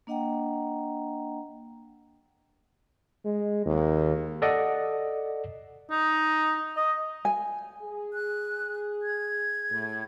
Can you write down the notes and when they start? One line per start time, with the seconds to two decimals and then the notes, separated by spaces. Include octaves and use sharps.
0.07 A#3 D4 D#5 F#5 G5 A#5
3.25 G#3
3.66 D#2
4.42 A4 D5 D#5 F#5
5.91 D#4
6.77 D#5
7.25 G#5
7.82 G#4
8.13 F#6
9.03 G#6
9.71 A2